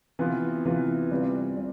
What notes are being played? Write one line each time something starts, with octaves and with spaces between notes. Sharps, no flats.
C3 E3 B3 F4
C3 E3 B3 F4
C3 G3 C4 F4
C3 G3 C4